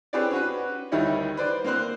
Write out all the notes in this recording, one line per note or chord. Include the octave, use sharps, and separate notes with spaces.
C4 G4 G#4 B4 C#5 D5
C#4 F#4 B4
D2 D#3 G3 D#4 E4 C#5
B4 C5 D5
A#3 C4 C5 F#6